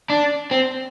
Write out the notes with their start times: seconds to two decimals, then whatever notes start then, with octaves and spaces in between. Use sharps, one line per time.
0.10 D4
0.51 C4